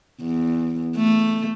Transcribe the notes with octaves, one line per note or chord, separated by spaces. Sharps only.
E2
A3